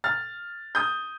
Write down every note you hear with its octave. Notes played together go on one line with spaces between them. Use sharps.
F6 A6
D#6 G6